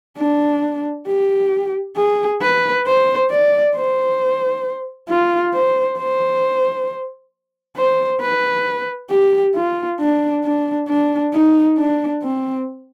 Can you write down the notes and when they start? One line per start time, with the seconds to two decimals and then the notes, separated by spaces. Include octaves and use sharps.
0.18 D4
1.07 G4
1.96 G#4
2.42 B4
2.86 C5
3.31 D5
3.75 C5
5.09 F4
5.54 C5
5.98 C5
7.77 C5
8.21 B4
9.10 G4
9.55 F4
10.00 D4
10.44 D4
10.88 D4
11.33 D#4
11.77 D4
12.23 C4